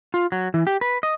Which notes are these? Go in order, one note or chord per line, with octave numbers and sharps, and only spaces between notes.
F4
F#3
E3
G4
B4
D#5